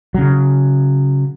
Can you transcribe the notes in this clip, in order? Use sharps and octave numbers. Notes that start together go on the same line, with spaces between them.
C#3 F#3